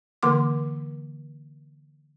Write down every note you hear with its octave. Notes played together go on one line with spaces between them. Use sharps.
D3 E3 A#3 C6 D6